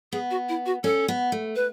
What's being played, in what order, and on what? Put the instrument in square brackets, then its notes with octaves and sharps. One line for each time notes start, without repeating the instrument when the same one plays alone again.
[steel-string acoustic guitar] B3 [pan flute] G#4
[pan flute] F#4
E4
F#4
[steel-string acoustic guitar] C#4 [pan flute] A4
[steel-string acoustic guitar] B3
A3
[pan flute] B4